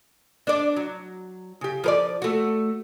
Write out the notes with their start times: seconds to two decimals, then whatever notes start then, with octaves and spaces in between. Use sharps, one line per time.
0.47 D4 D5
0.77 F#3
1.61 C#3 G4
1.84 F3 A#4 D5
2.22 A3 F#4